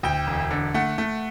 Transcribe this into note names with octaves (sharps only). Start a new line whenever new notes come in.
D2 G5
E1
D3
A3 F#5
A3